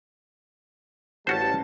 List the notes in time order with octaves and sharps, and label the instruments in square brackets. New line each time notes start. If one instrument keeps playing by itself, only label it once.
[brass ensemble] A1 G3 A5 [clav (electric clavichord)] C#4 F#4 C5